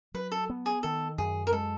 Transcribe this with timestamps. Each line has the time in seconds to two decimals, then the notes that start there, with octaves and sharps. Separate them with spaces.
0.14 F#3 B4
0.32 A4
0.50 B3
0.66 G#4
0.83 D#3 A4
1.18 F#2 G#4
1.47 A#4
1.53 G#3 A4